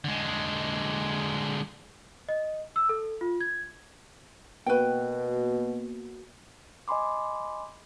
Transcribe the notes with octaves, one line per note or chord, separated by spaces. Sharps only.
D3 G#3
D#5
E6
A4
F4
G#6
B2 A#3 B3 F#4 B4 G5
D#5 G#5 B5 C6 D6